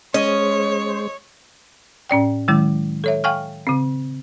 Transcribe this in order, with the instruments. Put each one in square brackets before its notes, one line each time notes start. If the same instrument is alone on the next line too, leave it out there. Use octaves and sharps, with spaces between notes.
[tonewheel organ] G#3 C5 [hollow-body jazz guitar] C#4 [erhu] C#5 [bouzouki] D#5
[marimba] A2 C#4 D5 G5
D#3 F#3 G#3 E4
A4 C#5 E5
F5 G5 G#5 C#6 F6
C#3 C4